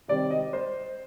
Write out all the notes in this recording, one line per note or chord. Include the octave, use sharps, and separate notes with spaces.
C3 D#3 G3 C4 D5
D#5
C5